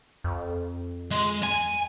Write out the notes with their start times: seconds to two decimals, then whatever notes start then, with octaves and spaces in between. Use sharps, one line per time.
0.24 F2
1.11 G#3
1.43 G#5